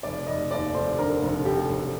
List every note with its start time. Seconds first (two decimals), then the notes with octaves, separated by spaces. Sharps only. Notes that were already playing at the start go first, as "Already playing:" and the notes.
0.03 F1 D5
0.27 F1 D#5
0.51 D#2 D5
0.74 F1 C5
0.99 D3 A#4
1.22 F1
1.45 F1 G4
1.69 F1